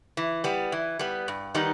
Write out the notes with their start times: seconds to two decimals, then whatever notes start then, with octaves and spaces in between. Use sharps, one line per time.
0.17 E3
0.44 G3 B3
0.72 E3
0.99 G3 B3
1.28 G2
1.54 D#3 G3 B3 D#4